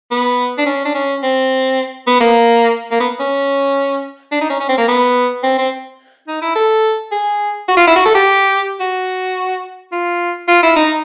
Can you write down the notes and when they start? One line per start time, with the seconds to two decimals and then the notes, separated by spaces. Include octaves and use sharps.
0.11 B3
0.58 D4
0.66 C#4
0.85 D4
0.95 C#4
1.23 C4
2.07 B3
2.21 A#3
2.91 A#3
3.00 B3
3.20 C#4
4.32 D4
4.41 D#4
4.50 C#4
4.60 C#4
4.69 C4
4.78 A#3
4.88 B3
5.44 C4
5.58 C4
6.28 D#4
6.42 E4
6.56 A4
7.12 G#4
7.69 F#4
7.77 F4
7.88 E4
7.96 F#4
8.05 A4
8.15 G4
8.80 F#4
9.92 F4
10.48 F4
10.63 E4
10.76 D#4